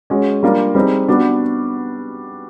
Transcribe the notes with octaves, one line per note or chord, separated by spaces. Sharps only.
G#3 C#4 F#4
G3 A#3 D4 F4
G3 C4 D#4 G#4
G3 B3 D4 F#4